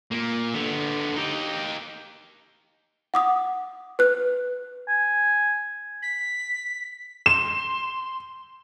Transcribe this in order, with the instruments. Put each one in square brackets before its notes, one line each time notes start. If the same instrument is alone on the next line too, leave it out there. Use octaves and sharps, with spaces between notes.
[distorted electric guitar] A#2 A#3
D3 B3
D#4 G4
[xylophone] F#5 D6 D#6
B4 F#6
[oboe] G#5
[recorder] B6
[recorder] C6 [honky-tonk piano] E7